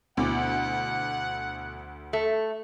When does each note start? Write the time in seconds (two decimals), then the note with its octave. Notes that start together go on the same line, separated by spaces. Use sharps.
0.17 D2 B2 E4 F#5 D6
2.13 A3